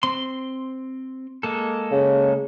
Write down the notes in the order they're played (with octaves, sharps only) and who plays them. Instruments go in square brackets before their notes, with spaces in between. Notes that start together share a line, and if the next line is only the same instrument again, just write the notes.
[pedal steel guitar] C4 C6
G#3 A#3 A4
[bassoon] C#3